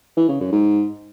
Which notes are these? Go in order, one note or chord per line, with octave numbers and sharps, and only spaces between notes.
E3
C#3
F#2
G#2